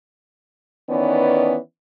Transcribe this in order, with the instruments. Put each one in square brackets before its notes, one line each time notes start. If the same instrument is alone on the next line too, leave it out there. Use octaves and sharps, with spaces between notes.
[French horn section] D#3 E3 B3 C#4 D5